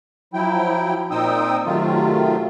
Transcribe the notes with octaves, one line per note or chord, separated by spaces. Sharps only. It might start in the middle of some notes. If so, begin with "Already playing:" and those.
F3 F#3 E4 G5
A#2 C4 D#4 G5 D#6 E6
C3 D#3 F#3 A3 F4